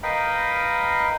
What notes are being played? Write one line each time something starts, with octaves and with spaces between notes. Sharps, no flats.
A#4 B4 D#5 F5 G5 B5